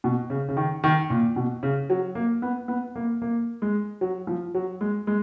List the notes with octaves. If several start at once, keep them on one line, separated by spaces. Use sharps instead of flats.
B2
C#3
C#3
D#3
D#3
A#2
B2
C#3
F#3
A#3
B3
B3
A#3
A#3
G#3
F#3
F3
F#3
G#3
G#3